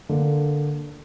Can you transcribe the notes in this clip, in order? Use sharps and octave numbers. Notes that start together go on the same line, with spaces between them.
D3 A#3